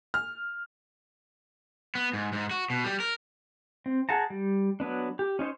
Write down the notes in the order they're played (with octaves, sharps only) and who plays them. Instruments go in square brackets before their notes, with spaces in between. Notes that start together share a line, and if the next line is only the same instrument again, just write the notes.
[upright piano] F6
[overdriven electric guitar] B3
G#2
G#2
F#4
B2
G3
A#4
[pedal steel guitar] C4
G#4 F#5 A5 A#5
G3
F#3 B3 D4
G4
C#4 D#4 C5 C#5